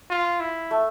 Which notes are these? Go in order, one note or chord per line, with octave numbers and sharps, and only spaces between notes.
F4
E4
A3